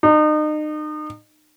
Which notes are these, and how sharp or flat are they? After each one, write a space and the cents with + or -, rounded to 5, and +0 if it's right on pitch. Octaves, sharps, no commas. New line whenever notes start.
D#4 -35